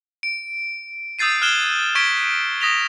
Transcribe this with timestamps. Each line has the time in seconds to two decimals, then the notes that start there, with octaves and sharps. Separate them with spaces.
0.23 D7
1.19 D#6 E6 G6 A6 C7 D#7
1.42 F6 F#6 G#6 E7 G7
1.95 C#6 G#6 B6 D7 G7
2.60 D#6 A#6 B6 F7 G7